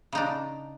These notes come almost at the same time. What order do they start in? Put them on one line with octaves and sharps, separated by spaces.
C#3 D#4 D4